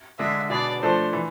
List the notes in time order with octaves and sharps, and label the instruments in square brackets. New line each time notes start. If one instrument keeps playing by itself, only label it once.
[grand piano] D3 G#3 D4 G#4 [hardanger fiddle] E5
[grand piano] B2 B3 D4 G#4 [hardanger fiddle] D5
[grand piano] F3 A3 D4 A4 [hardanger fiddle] C5
[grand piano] E3